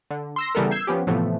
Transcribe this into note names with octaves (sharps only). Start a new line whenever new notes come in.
D3
C6 E6 A#6
C#3 E3 G3 B3 A4 A#4
E6 G6 G#6 C7
F3 B3 C#4 G4
A2 C3 E3 F3 A3 B3